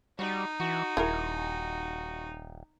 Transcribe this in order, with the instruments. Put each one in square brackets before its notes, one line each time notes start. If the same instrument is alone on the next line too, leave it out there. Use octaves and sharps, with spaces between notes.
[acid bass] G3 [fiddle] D#4 [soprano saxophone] F#4
[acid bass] E3 [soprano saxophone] F#4
[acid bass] D#1 [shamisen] E4 G#4 A#4 [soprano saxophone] F#4
[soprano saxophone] F#4